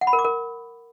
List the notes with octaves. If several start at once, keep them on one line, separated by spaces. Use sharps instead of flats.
F#5
B5
A#4
D6
A#4